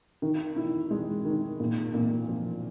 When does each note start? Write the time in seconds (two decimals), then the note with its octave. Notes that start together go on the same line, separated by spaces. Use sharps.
0.22 D#3
0.56 E4
0.91 G#3
1.25 D#3
1.60 A#2
1.94 A#2
2.28 F3